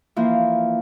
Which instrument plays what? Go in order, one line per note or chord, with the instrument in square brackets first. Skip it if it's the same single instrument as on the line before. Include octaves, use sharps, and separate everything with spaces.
[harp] E3 F3 A#3